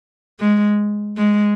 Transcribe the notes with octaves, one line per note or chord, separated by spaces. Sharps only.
G#3
G#3